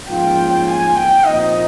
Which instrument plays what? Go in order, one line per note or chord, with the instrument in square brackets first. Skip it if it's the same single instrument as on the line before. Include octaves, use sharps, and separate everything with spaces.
[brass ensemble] G#2 F3 A#3 C#4 F4 [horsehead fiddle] G5
[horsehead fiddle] G#5
G5
[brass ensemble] A#2 F3 C4 D#4 [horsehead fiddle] D#5